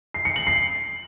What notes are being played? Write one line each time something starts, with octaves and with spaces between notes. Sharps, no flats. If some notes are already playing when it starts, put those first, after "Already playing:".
C7
C#7
F#7
C7